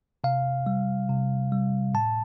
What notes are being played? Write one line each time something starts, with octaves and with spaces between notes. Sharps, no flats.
C3 F5
G3
C3
G3
A2 A5